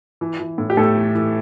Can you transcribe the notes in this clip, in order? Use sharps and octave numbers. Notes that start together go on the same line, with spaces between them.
E3
E3
A2
G4
A2 A3 A4
E3
E3